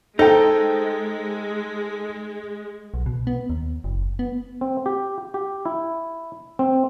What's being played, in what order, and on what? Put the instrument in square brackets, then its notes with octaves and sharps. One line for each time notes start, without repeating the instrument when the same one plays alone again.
[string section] G#3 [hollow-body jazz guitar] D#4 [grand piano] A4 [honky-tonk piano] C5 G5
[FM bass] B1
B2
B3
D#2
F#1
B3
[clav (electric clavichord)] C4
G4
G4
E4
C4